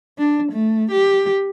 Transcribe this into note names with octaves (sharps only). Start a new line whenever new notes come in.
D4
A3
G4